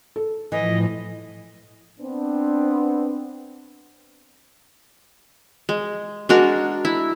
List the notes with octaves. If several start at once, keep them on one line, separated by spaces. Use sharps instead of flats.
A4
A2 E3 F3 D#5
B3 C4 D4
G#3
G#3 D4 F#4 A#4
E4